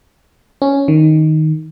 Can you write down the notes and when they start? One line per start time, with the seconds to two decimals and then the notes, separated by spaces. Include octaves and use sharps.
0.62 C#4
0.88 D#3